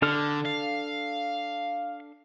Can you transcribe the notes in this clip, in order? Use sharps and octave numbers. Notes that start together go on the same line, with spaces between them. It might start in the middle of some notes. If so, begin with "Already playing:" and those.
D3 D4 A4 F6
F5